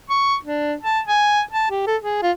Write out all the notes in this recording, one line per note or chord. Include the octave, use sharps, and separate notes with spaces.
C#6
D4
A5
G#5
A5
G4
A4
G#4
F4